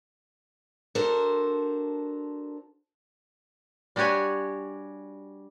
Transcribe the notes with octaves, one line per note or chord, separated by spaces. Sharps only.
D4 F#4 A4 A#4 C5
G3 D4 F#4 G4 C#5 G#5